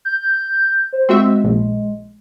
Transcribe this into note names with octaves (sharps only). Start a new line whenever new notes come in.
G6
C5
G#3 C4 F#4 E5
A#1